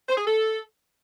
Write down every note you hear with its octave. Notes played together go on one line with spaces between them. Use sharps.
C5
G#4
A4